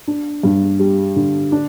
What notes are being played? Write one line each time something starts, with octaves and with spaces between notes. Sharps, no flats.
D4
G2
G3
D3
D4